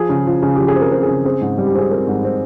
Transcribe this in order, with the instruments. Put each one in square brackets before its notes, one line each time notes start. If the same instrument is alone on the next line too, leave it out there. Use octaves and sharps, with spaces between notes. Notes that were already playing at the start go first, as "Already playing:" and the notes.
Already playing: [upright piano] F3 G#4
C#3
F3
C#3
F3 G4
G#4
C4
A#4
C4
G#4
C#3
C4 G#4
G#2
G3
G4
C4 G#4
C4 A#4
G#2
C4